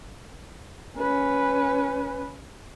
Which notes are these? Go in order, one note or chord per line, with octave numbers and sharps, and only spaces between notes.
C#4 B4